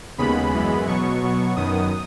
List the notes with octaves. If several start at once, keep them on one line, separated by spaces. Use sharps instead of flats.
D#2 C#3 G#3 B3 B5
F#2 E3 G#3 B3
B2 F#3 B3 C#6
B2 F#3 B3
F#2 D#3 F#3 B3 D#6